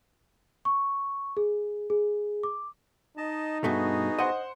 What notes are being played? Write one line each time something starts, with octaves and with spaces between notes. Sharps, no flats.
C#6
G#4
G#4
D6
D#4 D#5 A5
G2 B2 A3 B3 F#4 G#4
C5 D#5 F#5